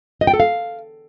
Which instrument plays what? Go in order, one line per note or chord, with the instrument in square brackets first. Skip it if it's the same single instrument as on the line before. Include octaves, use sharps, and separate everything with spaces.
[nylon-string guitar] D#5
G5
A4
F5